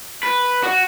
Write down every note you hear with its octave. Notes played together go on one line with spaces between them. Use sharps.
B4
F#4